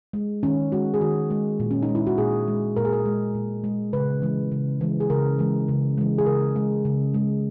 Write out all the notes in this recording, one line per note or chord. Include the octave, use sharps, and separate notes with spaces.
G#3
D#3 C#4
G#3 F#4
G#4
D#3 F#4
G#3
A#2
C#4
D#4
G#3
E4
F#4
A#2 G#4
G#3
A#2 A#4
G#4
A#4
G#3
A#2
G#3
C#3 B4
E3 G#3
C#3
E3 G#3
G#4
C#3 A#4
E3 G#3
C#3
E3 G#3
G#4
C#3 A#4
G#3
C#3
G#3